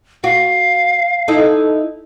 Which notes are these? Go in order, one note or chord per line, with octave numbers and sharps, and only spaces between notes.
F#4 F5
D#4 E4 A4